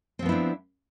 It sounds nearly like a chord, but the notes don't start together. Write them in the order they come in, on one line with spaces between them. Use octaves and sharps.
C4 F3 B3 E4 D4